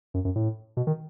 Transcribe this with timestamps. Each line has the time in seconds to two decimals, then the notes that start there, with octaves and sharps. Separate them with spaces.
0.14 F#2
0.25 F#2
0.36 A2
0.77 B2
0.87 D#3